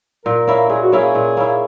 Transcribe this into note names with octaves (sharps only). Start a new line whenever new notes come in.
A#2 A#4
A#3 C#4 E4
A#2 G#4
F#4
A#3 C#4 E4 G#4
A#2
A#3 C#4 E4